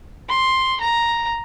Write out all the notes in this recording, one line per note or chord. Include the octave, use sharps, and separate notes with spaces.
C6
A#5